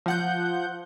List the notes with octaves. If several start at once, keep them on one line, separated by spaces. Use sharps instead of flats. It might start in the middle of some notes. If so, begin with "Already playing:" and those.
F3 F#5 G6